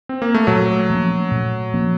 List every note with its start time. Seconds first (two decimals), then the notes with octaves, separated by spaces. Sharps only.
0.09 C4
0.22 A#3
0.34 A3
0.47 A#2 F#3
0.90 F3 A#3 C#4
1.31 A#2
1.74 F3 A#3 C#4